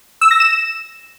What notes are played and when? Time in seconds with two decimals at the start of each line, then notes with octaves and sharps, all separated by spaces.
0.21 E6
0.31 A#6
0.40 E7